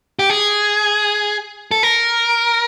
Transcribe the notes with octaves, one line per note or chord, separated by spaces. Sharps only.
G4
G#4
A4
A#4